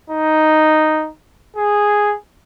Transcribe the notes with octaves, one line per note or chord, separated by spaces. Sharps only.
D#4
G#4